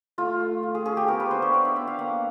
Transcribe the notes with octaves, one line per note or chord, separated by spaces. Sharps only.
A3 F4
A3
F4
G#4
C#4 G#4
G4
B3 A#4
B4
D4 C5
C#5
D4 D5
E5
B3 E5
F5
A#3 F#5